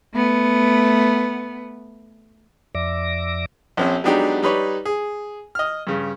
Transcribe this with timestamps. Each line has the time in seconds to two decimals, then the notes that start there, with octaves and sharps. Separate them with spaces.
0.14 A3 B3
2.75 F2 D5 E5 D6 A#6
3.77 A#1 C4 C#4
4.04 F#3 G#3 B3 D4 D#4 G4
4.42 G3 D#4 B4 C#5 D5
4.85 G#4
5.55 D#5 F6
5.87 G2 C#3